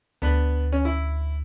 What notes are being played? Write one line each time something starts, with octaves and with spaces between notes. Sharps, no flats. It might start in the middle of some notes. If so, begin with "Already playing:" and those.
D2 B3 D4 B4
C#4
E4